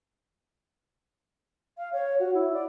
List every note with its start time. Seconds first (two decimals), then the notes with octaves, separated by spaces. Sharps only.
1.78 F5
1.93 C#5
2.19 F#4
2.34 E4
2.54 D5